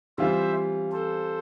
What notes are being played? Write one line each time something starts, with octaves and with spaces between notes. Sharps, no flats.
E3 G3 C4 F4 C5 E5
A4 C5